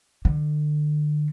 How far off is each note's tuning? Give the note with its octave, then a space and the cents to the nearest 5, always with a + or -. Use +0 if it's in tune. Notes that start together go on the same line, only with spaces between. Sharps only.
D3 +35